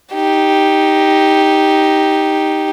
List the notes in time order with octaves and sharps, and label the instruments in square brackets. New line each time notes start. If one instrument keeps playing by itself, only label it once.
[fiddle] D#4 G4